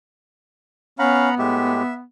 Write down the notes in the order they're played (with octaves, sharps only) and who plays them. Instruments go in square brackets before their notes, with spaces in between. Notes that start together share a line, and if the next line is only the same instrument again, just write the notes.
[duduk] B3 [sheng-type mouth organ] C#4 F5 [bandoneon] F#5 A#5 B5
[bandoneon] A2 G#3 G4 [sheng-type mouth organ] E5